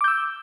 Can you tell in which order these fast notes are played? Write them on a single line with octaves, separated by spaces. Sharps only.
D6 G6 E6